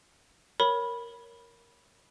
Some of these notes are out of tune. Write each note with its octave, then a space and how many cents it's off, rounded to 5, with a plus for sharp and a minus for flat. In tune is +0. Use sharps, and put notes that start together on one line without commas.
A#4 +0 C#5 +0 B5 -10